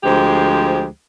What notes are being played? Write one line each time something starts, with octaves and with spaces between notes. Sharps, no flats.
D2 F3 G#3 G4 C5